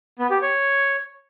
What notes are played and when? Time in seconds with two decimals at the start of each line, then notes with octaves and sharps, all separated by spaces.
0.19 B3
0.31 G4
0.42 C#5